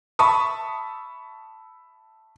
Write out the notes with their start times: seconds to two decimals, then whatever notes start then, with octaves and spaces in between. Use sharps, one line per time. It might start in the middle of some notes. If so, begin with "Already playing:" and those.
0.19 E5 A5 B5 C#6 D#6